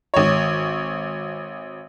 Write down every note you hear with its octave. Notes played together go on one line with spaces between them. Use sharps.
G#1 C#5